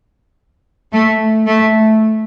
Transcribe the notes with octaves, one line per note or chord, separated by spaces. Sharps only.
A3
A3